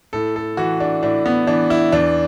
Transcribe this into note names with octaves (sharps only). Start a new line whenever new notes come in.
A2 A4
A4
E3 F#4
D4
A2 D4
B3
E3 D4
E4
E2 D4